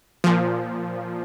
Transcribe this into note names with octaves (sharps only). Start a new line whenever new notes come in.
A#2 F3